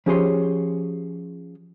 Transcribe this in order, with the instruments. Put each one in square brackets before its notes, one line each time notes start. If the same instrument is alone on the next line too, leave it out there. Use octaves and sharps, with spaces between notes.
[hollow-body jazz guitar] F3 C#4 G4 G#4 C#5 C6